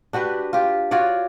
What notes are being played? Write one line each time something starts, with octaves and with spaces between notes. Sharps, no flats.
D4 F#4 G4 B4
F4 G4
F4 F#4 C#5 D5